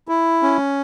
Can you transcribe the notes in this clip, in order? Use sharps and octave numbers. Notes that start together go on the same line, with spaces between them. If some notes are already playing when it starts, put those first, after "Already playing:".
E4
C#4